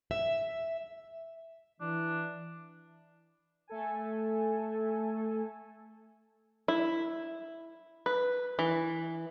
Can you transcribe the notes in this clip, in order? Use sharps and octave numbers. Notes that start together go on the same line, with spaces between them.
E5
E3 D4
A3 A4 G#5
E4
B4
E3